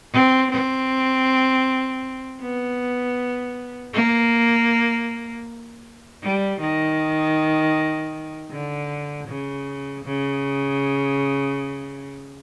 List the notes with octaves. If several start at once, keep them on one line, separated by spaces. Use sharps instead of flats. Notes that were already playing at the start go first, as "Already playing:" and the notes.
C4
C4
B3
A#3
G3
D#3
D3
C#3
C#3